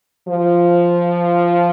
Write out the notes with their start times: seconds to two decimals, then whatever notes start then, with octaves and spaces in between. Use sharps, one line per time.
0.28 F3